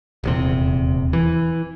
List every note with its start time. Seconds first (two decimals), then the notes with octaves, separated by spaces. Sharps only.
0.24 D#1 E2 C3
1.13 E3